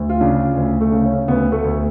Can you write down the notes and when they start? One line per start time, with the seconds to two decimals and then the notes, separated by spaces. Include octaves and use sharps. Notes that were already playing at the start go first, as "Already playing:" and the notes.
Already playing: D2
0.09 F4
0.21 C#3 D4
0.57 D2
0.81 A3
0.92 C#3
1.04 C#4
1.28 D2 B3
1.52 A3
1.64 D2